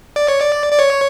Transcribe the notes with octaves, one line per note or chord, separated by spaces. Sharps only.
D5
C#5
D5
D5
C#5